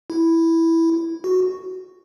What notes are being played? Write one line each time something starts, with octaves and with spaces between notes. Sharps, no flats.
E4
F#4